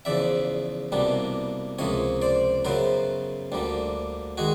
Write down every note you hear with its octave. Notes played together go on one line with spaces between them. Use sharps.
E2 C#3 F3 D5 E5
C2 B2 G3 A#3 D4
C#2 C3 F3 A#3 C#5 D#5
C5 D5
F#2 C#3 F#3 B3 A#4 C5
D2 D3 G3 A#3
D#3 G#3 F#4 G#4